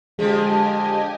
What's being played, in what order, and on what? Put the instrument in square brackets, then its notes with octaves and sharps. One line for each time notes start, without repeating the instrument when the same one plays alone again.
[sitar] D3 F3 [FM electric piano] G#3 [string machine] G4 D#5 G#5